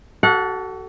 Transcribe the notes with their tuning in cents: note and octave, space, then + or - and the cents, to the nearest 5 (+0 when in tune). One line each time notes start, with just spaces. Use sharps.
F#4 +35 A4 +0 F#5 -25